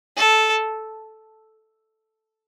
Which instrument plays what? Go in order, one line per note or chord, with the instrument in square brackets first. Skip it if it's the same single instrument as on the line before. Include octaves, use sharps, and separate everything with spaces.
[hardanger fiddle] A4